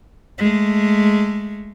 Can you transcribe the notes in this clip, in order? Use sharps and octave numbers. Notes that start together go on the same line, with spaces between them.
G#3 A3